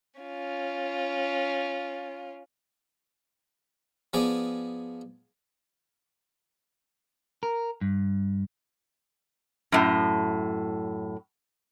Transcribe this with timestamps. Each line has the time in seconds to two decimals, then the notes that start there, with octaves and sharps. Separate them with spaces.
0.20 C#4 F4
4.13 F3 B3 G#4 D5
7.43 A#4
7.81 G2
9.72 F#2 A2